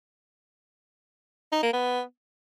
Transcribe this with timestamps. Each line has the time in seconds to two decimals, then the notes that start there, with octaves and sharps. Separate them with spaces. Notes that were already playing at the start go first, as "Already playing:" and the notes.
1.52 D#4
1.63 A#3
1.73 B3